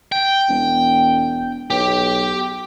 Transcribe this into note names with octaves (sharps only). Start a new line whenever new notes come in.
G5
E1
B1 G4